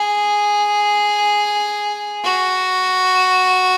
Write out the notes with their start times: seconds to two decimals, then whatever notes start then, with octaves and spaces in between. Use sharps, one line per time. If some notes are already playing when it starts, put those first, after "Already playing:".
Already playing: G#4
2.24 F#4